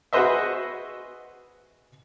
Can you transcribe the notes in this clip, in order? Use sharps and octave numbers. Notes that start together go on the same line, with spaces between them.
F#4 G#4 B4 C5 D#5 E5